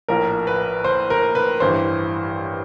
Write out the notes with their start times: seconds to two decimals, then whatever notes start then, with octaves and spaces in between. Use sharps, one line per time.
0.08 A#1 A2 F3 A#4
0.47 B4
0.84 C5
1.10 A#4
1.35 B4
1.60 A1 G2 E3 C5